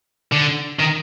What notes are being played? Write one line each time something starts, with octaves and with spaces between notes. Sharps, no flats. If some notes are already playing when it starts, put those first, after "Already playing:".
D3
D#3